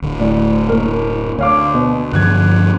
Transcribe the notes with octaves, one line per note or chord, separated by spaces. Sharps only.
D1 D2
A1 D5
F#1 A#4
D2 C#5 F5 D6
B2
G2 D3 F3 F#6 G#6